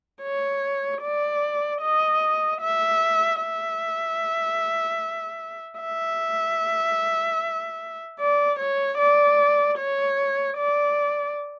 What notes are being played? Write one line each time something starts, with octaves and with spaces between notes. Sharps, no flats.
C#5
D5
D#5
E5
E5
E5
D5
C#5
D5
C#5
D5